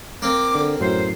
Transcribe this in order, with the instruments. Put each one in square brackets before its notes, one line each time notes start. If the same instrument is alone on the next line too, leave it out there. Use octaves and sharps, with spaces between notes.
[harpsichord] A#3 C4 [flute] D6
[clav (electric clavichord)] D3
[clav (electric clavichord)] F#2 A2 F#3 [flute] C5